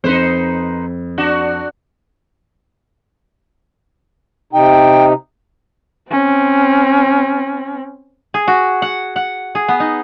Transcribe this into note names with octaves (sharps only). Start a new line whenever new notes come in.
F2 C4 D#4 B4 C5
D4 F#4
C3 D#4 G5
C4 C#4
G#4
F#4
F#5
F#5
G#4
B3
D#4